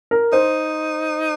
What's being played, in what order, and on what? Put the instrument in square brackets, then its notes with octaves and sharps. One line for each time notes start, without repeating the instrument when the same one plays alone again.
[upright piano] A#4
[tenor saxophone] D#4 [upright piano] C5